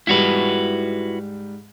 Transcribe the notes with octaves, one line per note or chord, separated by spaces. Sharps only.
G#2 G3 E4 F#4 B4